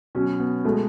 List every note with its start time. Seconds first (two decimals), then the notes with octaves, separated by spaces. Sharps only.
0.15 B2 F#3 C#4
0.40 B3
0.65 B2 G#3 A3